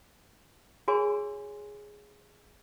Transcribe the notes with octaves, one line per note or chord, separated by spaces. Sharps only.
F#4 G#4 A#4 C#5 G#5 C6